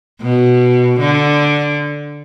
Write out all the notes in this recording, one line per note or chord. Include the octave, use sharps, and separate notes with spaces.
B2
D3